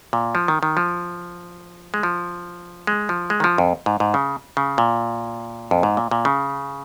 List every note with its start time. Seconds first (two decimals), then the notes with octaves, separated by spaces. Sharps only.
0.13 A#2
0.35 F3
0.48 D#3
0.63 D#3
0.77 F3
1.94 G#3
2.03 F3
2.87 G#3
3.09 F3
3.30 G#3
3.40 D#3
3.44 F3
3.58 F2
3.86 G#2
4.00 G#2
4.14 C#3
4.57 C#3
4.78 A#2
5.71 F2
5.83 G#2
5.97 A#2
6.11 A#2
6.25 C#3